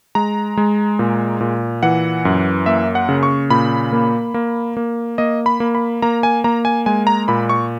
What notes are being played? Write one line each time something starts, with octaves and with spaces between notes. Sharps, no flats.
G#3 A#5
G#3
A#2
A#2
E3 F#5
F#2
A#3 E5
F#5
C#3
C#6
A#2 B5
A#3
A#3
A#3
A#3 D#5
B5
A#3
B5
A#3 A#5
G#5
A#3 A#5
G#5
G#3 G#5
A#5
A#2 B5
C#6